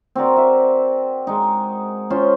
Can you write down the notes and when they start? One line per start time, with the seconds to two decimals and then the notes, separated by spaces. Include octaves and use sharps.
0.15 C4 F#4 A#4 D5
0.37 E5
1.27 G#3 D#4
2.10 C#4 F4 C5